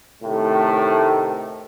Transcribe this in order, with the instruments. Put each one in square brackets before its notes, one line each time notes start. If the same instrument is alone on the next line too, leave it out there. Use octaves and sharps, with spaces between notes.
[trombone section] A2 C3 D#3 A3